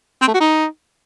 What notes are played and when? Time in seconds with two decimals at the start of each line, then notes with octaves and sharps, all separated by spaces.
0.22 C4
0.28 A3
0.34 F#4
0.40 D#4